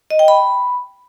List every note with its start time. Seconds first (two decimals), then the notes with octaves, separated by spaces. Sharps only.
0.11 D#5
0.19 G5
0.28 B5